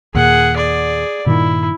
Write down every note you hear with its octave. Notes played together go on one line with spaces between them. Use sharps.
D#2 A#2 G#4 F#5
G#4 D5
G2 A#2 D#3 E4